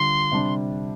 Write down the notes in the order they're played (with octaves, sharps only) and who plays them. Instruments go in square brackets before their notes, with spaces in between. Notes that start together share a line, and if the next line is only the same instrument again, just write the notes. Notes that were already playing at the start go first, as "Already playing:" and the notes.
Already playing: [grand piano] D3 G3 F4 [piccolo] C6
[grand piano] C3 G3 D4